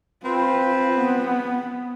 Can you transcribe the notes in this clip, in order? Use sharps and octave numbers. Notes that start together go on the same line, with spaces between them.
C4 F4 B4
B3